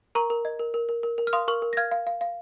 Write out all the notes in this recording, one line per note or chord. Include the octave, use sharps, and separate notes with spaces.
A#4 A#5 C#6
A#4
D#5
A#4
A#4
A#4
A#4
A#4
F6
F5 C6 D#6
A#4 C#6 F6
A#4
A#6
F5 F6 G#6
F5
F5
F5